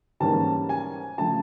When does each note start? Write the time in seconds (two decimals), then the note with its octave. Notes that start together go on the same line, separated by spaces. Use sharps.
0.20 G#2 E3 G3 A#3 C#4 A5
0.69 G#5
1.18 C#3 F3 A3 A5